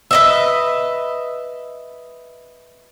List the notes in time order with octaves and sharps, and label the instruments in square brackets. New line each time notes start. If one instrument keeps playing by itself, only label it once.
[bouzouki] B4 D#5 E5